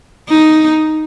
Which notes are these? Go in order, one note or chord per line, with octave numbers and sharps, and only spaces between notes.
D#4